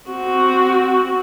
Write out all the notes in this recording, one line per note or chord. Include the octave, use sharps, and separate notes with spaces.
C4 F#4